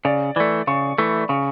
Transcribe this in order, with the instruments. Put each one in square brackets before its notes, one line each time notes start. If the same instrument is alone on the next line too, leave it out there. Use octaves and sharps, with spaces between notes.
[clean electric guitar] C#3 [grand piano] D5
[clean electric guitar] E3 A3 [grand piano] D5
[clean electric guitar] C#3 [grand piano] C#6
[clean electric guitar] E3 A3 [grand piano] B5
[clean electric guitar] C#3 [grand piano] C#6